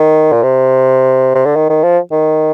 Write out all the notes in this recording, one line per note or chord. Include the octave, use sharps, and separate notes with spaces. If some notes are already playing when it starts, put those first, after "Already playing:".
Already playing: D#3
A#2
C3
C3
D3
D#3
D#3
F3
D#3